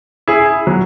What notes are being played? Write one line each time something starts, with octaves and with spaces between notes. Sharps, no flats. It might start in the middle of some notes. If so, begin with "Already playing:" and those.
E4 G#4
F#3